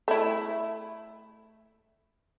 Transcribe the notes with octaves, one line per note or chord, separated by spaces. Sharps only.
A3 E4